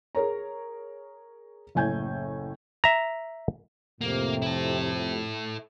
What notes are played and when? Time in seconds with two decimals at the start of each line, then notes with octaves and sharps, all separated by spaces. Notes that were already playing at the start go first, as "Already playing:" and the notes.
0.15 G#4 A#4 C#5 A#5
1.75 F#1 A2 G#5 G6 G#6
2.84 E5 A#5
4.01 F2 A2 C3 A#3
4.42 E4 A4